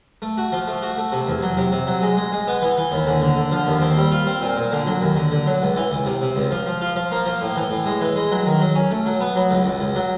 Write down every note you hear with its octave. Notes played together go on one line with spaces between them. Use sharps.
A3
F#4
F3
A3
F#4
A3
C3
E2
F#3
C3
C3
F#3
G#3
G#3
G#3
B3
E3
E3
D#2
D3
D3
D3
F3
D#2
C4
G3
F4
C4
A#2
A#2
D3
F#3
D#2
D3
D3
F#3
C#2
E3
C#2
C3
C3
C#2
F3
F3
F4
F3
A#3
F3
A2
E3
A2
G#3
E3
G#3
F#3
D#3
F#3
C#4
A3
F#3
B3
F#3
C#2
C#2
C#2
F#3